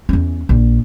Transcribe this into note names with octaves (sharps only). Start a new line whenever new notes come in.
E2 C#4
A#1